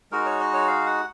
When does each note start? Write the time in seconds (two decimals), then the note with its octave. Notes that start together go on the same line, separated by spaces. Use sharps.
0.11 G#3 D#4 F#4 A#4
0.26 C#5
0.40 D#5
0.54 C#5
0.68 F5
0.86 F#5